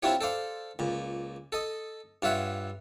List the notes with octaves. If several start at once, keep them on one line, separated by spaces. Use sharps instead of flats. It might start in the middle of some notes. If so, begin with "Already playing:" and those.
C4 D4 E4 F4 G4 C#5
A4 C5 D5 F5
C#2 A#2
A4 D#5
G2 F4 C#5 E5 F#5